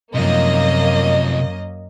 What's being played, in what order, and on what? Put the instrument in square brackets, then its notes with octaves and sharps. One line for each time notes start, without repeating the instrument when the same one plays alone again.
[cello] F#2 [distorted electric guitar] C3 F3 [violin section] A#3 D#5